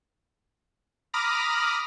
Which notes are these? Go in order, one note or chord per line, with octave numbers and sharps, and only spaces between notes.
A#5 B5 D6 D#6 F6 A#6